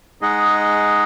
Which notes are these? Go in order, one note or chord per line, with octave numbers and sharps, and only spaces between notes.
G#3 D#4 G#4 D#5 F#5